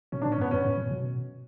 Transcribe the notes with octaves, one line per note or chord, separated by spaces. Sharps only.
B2 C#4
D4
A#2
C#4
G2
B3
F#2 C#4
G2
A#2
B2